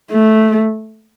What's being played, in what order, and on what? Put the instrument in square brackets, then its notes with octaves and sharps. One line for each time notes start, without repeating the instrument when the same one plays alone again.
[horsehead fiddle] A3